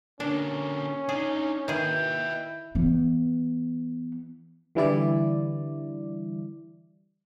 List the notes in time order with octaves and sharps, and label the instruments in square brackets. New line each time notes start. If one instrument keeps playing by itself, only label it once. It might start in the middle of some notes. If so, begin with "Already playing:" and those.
[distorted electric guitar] D3 A#3 [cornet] C#4 [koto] D4
[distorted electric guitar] D4 D#4 [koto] G#4
[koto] D#3 G#4 [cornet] E4 [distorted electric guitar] B4 D#5 [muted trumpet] G5
[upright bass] E3 B3
[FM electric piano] D3 E3 G3 E4 D5